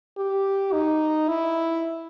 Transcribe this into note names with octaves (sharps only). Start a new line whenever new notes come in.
G4
D#4
E4